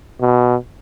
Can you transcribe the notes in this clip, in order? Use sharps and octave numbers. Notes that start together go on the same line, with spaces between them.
B2